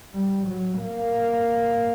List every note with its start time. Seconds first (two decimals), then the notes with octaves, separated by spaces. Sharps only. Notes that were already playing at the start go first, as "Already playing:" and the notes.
0.13 G3
0.47 F#3
0.82 A#3